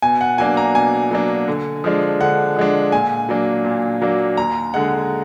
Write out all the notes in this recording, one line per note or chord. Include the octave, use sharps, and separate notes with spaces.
B2 G#5
F#5
F#3 A#3 D4 G#5
A#5
B2 G#5
F#3 A#3 D4
D3
F3 G#3 D4
D3 F#5
F3 G#3 D4
A#2 G#5
F#3 A#3 D4
A#2
F#3 A#3 D4
D#2 A#5
D3 G#3 F#5